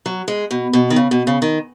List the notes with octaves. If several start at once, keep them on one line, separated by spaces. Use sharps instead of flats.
F#3
G#3
B2
B2
D#3
C#3
B2
C#3
D#3